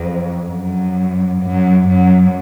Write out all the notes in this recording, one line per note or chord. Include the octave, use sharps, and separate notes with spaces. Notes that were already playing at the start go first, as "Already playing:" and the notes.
Already playing: F2
F#2
F#2
F#2